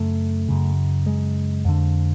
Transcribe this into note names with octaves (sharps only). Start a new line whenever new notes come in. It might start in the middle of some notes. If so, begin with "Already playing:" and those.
Already playing: F#2 C#3 A3
F#2 C#3
G#3
F2 D3